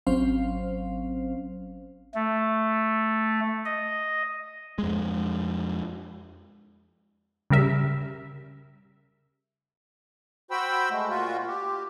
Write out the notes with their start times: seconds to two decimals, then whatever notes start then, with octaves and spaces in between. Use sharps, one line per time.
0.07 G#1 F#3 C4 C#4 C5 F5
2.15 A3
3.65 D#5
4.79 F2 G#3
7.50 C#3 G3 A#4 E5
10.51 F#4 C5 G5 B5 E6
10.90 G#3 A3
11.09 A#2 F4 F#4
11.47 G4